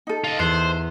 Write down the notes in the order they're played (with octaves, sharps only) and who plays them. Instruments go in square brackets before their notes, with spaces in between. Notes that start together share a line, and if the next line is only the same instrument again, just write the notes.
[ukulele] D#4 A4
[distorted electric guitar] F4 D#5
[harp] E2 F#6 C7 [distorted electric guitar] C5